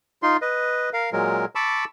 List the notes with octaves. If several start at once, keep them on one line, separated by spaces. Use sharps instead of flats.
D#4 F4 C6
B4 D#5
A#4 F5
A#2 F#3 G#3 A#4
A5 B5 C#6 D6 E6